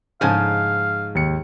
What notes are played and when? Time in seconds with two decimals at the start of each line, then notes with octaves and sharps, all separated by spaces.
0.21 G#2 C#3 F3 D#4 F5 G#5 A5
1.15 D#2 C#7